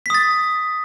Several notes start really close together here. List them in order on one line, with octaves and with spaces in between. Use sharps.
B6 D#6 A6